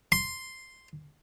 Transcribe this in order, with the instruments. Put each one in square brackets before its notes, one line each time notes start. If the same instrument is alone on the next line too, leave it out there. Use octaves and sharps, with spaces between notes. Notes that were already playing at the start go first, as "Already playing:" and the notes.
[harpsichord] C6